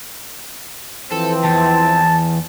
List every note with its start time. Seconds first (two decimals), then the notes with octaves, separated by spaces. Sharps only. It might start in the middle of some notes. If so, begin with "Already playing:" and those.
1.12 E3 F3 C4 A4
1.44 E2 A5